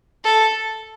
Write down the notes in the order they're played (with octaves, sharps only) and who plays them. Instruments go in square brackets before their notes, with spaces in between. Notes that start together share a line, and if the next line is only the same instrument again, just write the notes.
[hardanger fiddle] A4